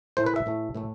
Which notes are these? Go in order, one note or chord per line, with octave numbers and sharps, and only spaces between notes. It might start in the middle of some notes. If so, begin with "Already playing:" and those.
A2 E3 A3 C5
B4
E5
A2 E3 A3
A2 E3 A3